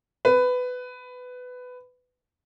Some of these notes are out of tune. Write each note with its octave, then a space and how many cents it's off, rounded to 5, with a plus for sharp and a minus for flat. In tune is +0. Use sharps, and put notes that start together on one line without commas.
B4 +15